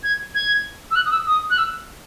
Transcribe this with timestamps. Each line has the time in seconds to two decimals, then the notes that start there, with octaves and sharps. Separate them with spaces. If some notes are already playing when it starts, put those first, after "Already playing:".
0.03 G#6
0.35 G#6
0.91 E6
0.96 F#6
1.06 D#6
1.11 E6
1.26 D#6
1.50 F#6
1.58 E6